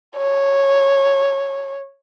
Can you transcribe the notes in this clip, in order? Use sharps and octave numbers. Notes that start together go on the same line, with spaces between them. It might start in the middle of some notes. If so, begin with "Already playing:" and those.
C#5